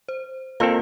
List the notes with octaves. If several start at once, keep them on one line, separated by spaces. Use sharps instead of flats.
C5
A#3 C4 F4 A4 A#4 F5